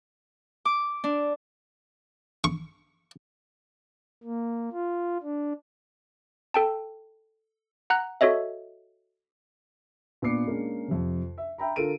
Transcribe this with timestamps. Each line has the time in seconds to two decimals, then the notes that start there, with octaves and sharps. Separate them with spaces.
0.65 D6
1.04 D4
2.44 C#6
4.24 A#3
4.72 F4
5.23 D4
6.54 A4 G5 A5
7.90 F#5 A#5 F#6
8.21 F#4 A4 C#5 D#5 E5
10.22 A#2 B3 D4 D6 C7 C#7
10.48 G#3 A#3 C#4 D4
10.88 F2 C3
11.38 E5
11.58 E5 G5 A#5 B5
11.76 D3 F4 A4 A#4 D7 D#7